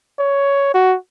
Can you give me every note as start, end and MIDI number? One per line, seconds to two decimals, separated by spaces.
0.19 0.73 73
0.74 0.96 66